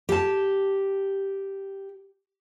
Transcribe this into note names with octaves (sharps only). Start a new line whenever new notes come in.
G4 A5